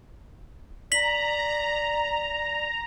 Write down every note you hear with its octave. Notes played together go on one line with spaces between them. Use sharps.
D5 A#5 B6 F#7